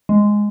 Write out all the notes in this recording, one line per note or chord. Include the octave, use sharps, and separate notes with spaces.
G#3